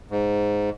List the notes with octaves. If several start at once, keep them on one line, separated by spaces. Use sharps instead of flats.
G#2